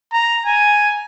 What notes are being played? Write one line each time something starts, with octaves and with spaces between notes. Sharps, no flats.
A#5
G#5